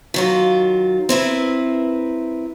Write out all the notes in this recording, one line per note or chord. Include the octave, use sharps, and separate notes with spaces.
D#3 F#3 F4
C4 E4 A#4 B4